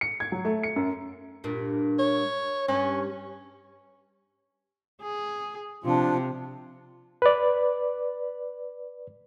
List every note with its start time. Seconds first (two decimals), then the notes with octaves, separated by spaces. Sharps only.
0.01 C#7
0.20 G#6
0.32 F#3
0.45 A3
0.63 C#7
0.76 F#2
1.44 G2 A#2
1.99 C#5
2.68 G2 C#4
5.02 G#4
5.84 C3 F3 D4 F4
7.22 B4 D5